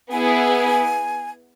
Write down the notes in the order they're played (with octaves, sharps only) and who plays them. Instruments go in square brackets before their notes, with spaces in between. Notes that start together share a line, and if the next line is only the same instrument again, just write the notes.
[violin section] B3 E4 G#4 [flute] G#5